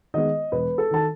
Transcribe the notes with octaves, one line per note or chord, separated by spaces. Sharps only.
D#3 G#3 B3 D#5
E1 B4
A4
D#3 A5